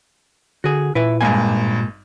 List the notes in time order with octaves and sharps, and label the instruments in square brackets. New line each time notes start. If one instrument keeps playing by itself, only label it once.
[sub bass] D3 [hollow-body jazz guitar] F#4 G#4
[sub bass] A#2 [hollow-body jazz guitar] E4 B4 E5
[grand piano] G#1 G2 [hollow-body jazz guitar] G#3 A#3 G#5